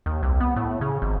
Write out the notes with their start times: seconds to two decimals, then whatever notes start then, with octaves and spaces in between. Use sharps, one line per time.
0.06 D#2
0.23 C2
0.40 B3
0.56 A2
0.81 C#3
1.02 G#1